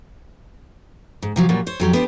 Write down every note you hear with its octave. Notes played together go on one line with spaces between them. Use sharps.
G#2
C3 F3 F#3
A#2 F#3 G3
C5 C#5
F2 F#3 G4
B3 D4 G4 C5